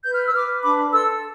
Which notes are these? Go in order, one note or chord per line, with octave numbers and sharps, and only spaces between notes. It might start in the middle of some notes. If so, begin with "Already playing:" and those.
B4 G6
F6
E6
B4 D6 F6
D4 B5 D6
A4 C6 E6